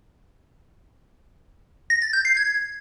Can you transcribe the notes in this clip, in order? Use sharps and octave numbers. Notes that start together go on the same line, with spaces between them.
A#6
A6
G6
C7
G#6